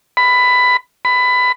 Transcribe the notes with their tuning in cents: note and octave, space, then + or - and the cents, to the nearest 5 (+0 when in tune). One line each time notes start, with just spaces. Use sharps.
B5 +15
B5 +20